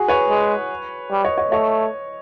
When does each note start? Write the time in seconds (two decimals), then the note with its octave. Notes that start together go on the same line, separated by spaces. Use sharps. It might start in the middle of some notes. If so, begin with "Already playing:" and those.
Already playing: F#4 G#4
0.08 B4 C#5
0.30 G#3
1.11 G3
1.25 C#5 D#5
1.38 C#5 D#5
1.51 A3 C#5 D#5